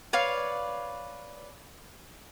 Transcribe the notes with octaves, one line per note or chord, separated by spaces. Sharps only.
B4 C#5 D5 F5